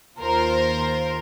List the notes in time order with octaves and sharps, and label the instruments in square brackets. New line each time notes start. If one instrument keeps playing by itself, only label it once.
[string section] D#2 F4 A#4 C5